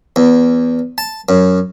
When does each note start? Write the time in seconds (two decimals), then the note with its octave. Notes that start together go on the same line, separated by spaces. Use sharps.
0.16 E2
0.98 A5
1.29 F#2